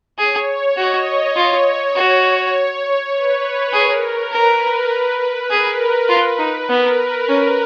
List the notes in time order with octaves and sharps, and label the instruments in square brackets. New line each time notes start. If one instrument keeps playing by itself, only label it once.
[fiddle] G#4 [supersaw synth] C#5
[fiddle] F#4 [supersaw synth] D#5
[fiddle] F4 [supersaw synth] C#5
[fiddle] F#4
[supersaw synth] B4
[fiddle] G#4 [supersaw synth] A#4
[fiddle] A#4 [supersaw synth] B4
[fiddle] G#4 [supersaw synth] A#4
[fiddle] F4 [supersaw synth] B4
[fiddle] D#4
[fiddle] B3 [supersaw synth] A#4
[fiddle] C#4